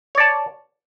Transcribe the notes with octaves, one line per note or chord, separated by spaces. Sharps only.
C#5 D5 A5